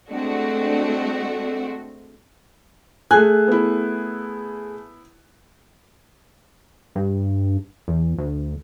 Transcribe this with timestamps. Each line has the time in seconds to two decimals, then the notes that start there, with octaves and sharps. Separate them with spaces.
0.10 G#3 A3 C4 D4 F#4
3.11 A3 G#4 G#5 F#6
3.48 B3 E4
6.95 G2
7.88 E2
8.18 D2